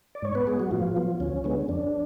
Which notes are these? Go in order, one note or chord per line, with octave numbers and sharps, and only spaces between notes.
D5
G#2 C#5
B3 B4
G#3 B3 G#4
F#3 F#4
A2 F3 F4
F#3 B3
D2 C#4
D3 G#3 B3
F2 D4